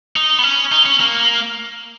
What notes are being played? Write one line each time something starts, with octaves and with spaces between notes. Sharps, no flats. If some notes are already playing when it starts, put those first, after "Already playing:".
D#4
B3
C#4
D#4
C#4
A#3